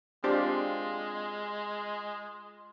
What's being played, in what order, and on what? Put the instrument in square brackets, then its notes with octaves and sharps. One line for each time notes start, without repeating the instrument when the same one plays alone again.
[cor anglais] G#3 [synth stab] C4 D4 G4 [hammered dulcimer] F4